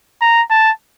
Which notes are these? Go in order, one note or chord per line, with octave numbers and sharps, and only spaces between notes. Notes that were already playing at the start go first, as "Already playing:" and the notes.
A#5
A5